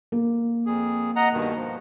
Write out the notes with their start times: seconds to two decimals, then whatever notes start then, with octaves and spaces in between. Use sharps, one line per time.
0.12 A#3
0.66 F2 G#4
1.16 D#5 F#5 A#5
1.33 G2 B2 D#3
1.55 F3